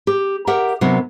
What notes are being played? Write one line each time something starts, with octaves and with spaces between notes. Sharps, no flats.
G4
G4 A#4 E5 F#5
C3 F#3 B3 D4 A#4